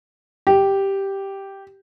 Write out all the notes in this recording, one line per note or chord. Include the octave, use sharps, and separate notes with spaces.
G4